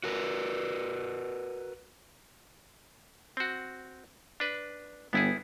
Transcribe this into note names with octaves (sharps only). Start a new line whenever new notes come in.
F#4 A#4 B4
C4 F#4
D4 B4
G1 B3 E4 G#4